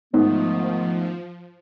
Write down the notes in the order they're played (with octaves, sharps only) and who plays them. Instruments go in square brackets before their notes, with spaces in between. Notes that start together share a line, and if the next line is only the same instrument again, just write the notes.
[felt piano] G#2 [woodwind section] D#3 A3 B3 [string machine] F3